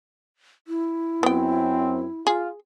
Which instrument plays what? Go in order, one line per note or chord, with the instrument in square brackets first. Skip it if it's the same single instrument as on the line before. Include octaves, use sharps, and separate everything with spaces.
[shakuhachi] E4
[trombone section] F#2 C4 [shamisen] B3 G5
[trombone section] F4 [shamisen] G#4